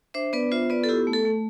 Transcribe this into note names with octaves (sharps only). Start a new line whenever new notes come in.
D4 C5 E5
B3 B4 D5
F4 C5 E5
B3 B4 D5
A4
E4 G4
A3
A4
A3